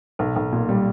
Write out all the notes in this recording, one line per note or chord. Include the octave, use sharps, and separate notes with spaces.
B1
B1
A#2
G3